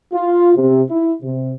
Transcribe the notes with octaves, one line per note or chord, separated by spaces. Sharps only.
F4
C3
E4
C3